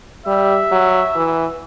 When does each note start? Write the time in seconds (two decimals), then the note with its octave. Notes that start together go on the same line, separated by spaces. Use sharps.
0.26 G3 E5
0.71 F#3
1.15 E3